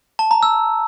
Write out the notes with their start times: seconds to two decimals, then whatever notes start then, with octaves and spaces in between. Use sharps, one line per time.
0.19 A5
0.31 A#5
0.43 E6